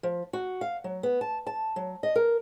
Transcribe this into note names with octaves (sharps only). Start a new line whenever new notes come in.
F3
F#4
F5
F#3
B3
A5
A5
F#3
D#5
A#4